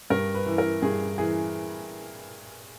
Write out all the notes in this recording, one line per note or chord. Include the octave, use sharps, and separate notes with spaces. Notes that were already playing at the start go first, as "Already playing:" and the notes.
G2 A#4
B4
E3
A#4
G2 G#4
E3 G#4